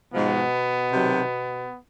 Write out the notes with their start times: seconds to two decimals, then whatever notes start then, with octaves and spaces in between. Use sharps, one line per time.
0.13 G#2 B2 F3 G#3 B3
0.92 C3 D#3 F#3